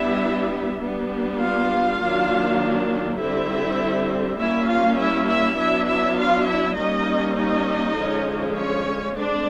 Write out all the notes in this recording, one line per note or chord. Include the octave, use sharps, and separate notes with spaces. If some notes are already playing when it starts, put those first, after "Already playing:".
Already playing: G3 B3 D4 E4 E5
G3 B3 D4
F4 F5
D#3 F#3 A#3 D4
D3 G3 C4 E4 E5
G3 A#3 C#4 E4 E5
F4 F5
E4 E5
E4 E5
F#3 B3 D4 E4 E5
E4 E5
F4 F5
E4 E5
G3 A#3 C#4 D#4 D#5
D#4 D#5
D3 F3 G#3 C#4
C#4 C#5
G#3 C4 D4 D5